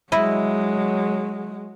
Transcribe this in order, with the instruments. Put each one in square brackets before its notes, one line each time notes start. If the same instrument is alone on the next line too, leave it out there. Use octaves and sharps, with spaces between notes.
[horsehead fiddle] F#3 G#3 [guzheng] E4 D#5